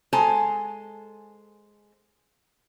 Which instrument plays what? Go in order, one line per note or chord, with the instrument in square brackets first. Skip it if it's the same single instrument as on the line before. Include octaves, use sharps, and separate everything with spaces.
[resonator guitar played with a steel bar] G#3 A4 C5 G#5 A#5